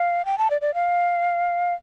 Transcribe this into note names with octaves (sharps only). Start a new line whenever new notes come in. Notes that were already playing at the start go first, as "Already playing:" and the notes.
Already playing: F5
G5
A5
D5
D5
F5